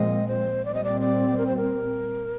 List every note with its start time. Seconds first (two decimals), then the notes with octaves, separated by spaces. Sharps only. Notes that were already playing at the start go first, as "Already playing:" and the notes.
Already playing: A#2 F3 G#3 C4 D#5
0.28 C5
0.65 A#2 G3 C4 D5
0.74 D#5
0.84 D5
1.01 D5
1.38 A#4
1.47 C5
1.57 A#4